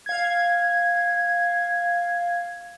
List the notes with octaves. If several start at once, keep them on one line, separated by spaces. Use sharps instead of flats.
F5 G#6